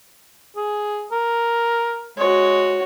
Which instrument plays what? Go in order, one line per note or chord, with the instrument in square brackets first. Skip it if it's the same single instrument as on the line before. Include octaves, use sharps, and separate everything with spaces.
[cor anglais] G#4
A#4
[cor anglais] G#3 [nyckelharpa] F#4 C#5